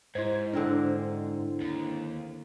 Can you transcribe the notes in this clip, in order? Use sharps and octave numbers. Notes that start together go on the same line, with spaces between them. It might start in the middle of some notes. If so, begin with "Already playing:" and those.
G#2 E4 C5 G#6
D3 C4 D4 A#4
D#2